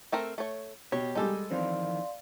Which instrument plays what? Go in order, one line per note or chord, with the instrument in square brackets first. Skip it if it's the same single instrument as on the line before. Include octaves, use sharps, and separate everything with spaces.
[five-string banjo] A3 C4 A#4
A3 C#5
[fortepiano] B2 [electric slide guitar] G4 [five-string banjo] C#5
[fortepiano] G3 G#3 [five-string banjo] D#4 A4
[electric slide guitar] F2 D#3 E3 [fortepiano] C4 [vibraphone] D5 F5 C6